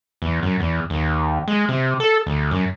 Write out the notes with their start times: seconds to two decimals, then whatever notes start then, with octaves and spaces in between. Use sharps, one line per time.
0.22 E2
0.43 F#2
0.60 E2
0.90 D#2
1.48 G#3
1.69 C3
2.00 A4
2.27 D2
2.51 F#2